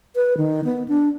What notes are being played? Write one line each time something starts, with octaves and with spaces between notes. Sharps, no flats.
B4
D#3
B3
D4